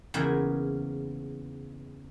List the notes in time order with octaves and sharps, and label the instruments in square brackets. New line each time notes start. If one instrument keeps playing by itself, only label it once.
[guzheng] E2 C#3 A#3 D#4 E4 A#5